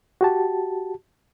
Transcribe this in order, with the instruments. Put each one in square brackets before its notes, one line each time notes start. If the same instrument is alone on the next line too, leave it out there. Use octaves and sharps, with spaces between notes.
[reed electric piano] F#4 G4 A5